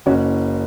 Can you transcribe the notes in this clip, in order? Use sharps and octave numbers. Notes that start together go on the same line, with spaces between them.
F#1 C#4 F#4